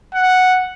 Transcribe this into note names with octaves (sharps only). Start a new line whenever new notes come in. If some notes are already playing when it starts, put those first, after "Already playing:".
F#5